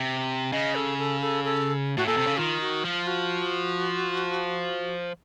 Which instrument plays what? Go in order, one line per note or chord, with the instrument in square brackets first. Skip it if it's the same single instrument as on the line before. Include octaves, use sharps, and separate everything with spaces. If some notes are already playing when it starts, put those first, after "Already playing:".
Already playing: [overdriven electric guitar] C3
[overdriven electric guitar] C#3 [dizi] D#5
[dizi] A4
A4
A4
A4
[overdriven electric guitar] A2 [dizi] F#4
[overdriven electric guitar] A#2 [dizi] A4
[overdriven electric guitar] C3
C#3
[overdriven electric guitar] D#3 [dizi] F4
[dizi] F#4
[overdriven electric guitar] F3 [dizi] F4
[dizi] F#4